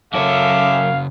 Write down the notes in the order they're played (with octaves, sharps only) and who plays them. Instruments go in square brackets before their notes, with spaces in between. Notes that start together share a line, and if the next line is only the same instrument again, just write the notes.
[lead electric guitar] F#2 C#5 [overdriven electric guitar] C#3 F#4 [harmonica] A4 E5 D6 [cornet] F5